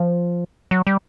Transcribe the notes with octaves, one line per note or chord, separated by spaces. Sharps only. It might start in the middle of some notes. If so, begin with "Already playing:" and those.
Already playing: F3
F#3
G3